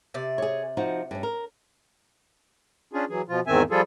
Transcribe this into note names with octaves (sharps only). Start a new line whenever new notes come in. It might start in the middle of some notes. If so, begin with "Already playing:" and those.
C3 D5
G#4 C#5
F3 D#4 F#4
G2 C#4
A#4
C#4 D4 F4 G#4
E3 F#3 G#4
B2 F3 F4
E2 G#2 D#3 C4 E5 G#5
F3 G3 F4 G#4 A4